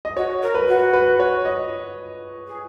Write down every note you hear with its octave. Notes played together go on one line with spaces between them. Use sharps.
D#5
F#4 C#5
A#4
B4
F#4
B4
C#5
D#5
G#4